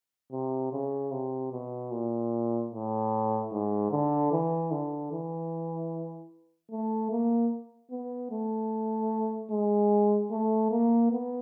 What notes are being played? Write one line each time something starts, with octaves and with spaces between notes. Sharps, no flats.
C3
C#3
C3
B2
A#2
A2
G#2
D3
E3
D3
E3
A3
A#3
B3
A3
G#3
A3
A#3
B3